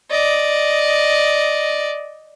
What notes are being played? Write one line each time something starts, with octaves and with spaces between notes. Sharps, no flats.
D5 D#5